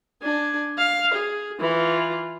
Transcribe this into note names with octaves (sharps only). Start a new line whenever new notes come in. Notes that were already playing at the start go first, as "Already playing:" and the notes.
D4 G#5
F5
G#4
E3 F4